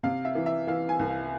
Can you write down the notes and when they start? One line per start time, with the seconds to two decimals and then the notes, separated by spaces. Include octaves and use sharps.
0.03 C3 F5
0.25 E5
0.35 E3
0.46 E5
0.67 E3 F5
0.89 G#5
0.99 C2
1.09 F5